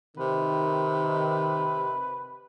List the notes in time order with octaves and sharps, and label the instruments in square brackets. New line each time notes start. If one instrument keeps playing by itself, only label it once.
[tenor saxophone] C3 [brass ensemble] D#3 [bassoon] B4